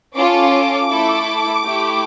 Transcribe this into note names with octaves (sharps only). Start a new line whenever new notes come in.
C#4 F4 A4 D6
A3 E4 A4
A3 E4 G4